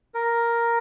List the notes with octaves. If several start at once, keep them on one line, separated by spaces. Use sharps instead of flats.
A#4